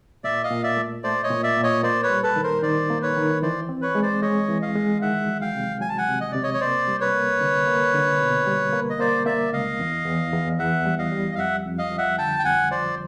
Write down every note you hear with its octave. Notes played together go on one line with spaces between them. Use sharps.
A#2 D5 E5
D#5 F5
A#2
D5 E5
A3
A3 C5 D5
C#5 D#5
A#2
D5 E5
A#2
C#5 D#5
A#3 C5 D5
B4 C#5
G3
A4 B4
D#3
A#4 C5
D#3 C5 D5
A#3
B4 C#5
D#3
E3 C5 D5
C4
B4 C#5
G#3
C5 D5
G#3 C#5 D#5
E3
D#5 F5
G#3
D#3 E5 F#5
F#3
F5 G5
C3
F#3 G#5
A5
F#5 G#5
C3
D#5
C3 D5
C#5 D#5
C#5
A#3 C5 D5
G3
B4 C#5
A#3
D3
A#3
D3
B2
G3
A#3
D#5
A#3 C5 D5
A#3 D5 E5
C#2 D#5 F5
E2
E2
E2
E2 E5 F#5
G3
D#5 F5
G3
F5
F2 E5 F#5
F2
D#5 F5
F3
E5 F#5
D3 G5 A5
G5
F2 F#5 G#5
F3 C5 D5